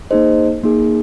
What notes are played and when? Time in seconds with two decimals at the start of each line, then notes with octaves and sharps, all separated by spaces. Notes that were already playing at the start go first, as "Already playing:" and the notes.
0.11 A#3 D#4 G#4 C5 D#5
0.64 A#3 D#4 G#4